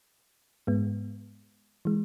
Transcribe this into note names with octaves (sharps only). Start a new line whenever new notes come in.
G#2 G#3 B3
E3 G#3